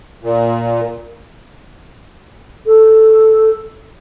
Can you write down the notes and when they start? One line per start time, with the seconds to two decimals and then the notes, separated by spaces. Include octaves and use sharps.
0.23 A#2
2.66 A4